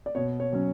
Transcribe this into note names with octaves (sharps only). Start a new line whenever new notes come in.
D5
B2 C#5
C#5
F#3 C#4